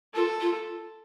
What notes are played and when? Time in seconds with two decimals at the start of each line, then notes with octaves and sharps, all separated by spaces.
0.14 F4 A4
0.40 F4